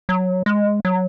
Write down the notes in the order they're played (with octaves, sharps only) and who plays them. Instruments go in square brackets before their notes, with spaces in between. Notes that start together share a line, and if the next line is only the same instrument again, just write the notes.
[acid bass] F#3
G#3
F#3